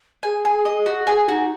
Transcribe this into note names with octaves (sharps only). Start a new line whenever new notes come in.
G#4 G#5
G#5
D#5
F#4
G#4 G#5
D#4 F#4